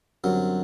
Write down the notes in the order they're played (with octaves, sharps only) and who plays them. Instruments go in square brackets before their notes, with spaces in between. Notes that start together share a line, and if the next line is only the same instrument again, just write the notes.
[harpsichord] F#2 F#3 [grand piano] D3 G3 C4